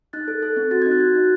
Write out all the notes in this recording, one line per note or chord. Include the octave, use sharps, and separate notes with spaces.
D#4 F#6 A6
A4
A4
C4
F#4 A6
D#4 G#6
F#6 A6
F#4
D#4